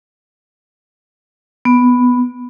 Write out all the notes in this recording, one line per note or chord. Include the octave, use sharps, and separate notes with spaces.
B3